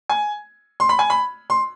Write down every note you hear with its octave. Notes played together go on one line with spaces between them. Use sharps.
G#5
C6
B5
G#5
B5
C6